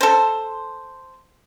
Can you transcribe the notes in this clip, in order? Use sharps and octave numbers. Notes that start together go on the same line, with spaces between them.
A4 C5